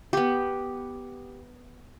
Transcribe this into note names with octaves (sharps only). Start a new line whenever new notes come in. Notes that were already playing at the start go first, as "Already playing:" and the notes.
B3 G4